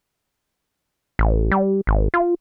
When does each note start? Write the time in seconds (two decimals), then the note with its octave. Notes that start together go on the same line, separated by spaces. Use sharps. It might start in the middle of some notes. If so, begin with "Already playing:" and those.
1.19 A1
1.51 G3
1.87 G#1
2.14 F4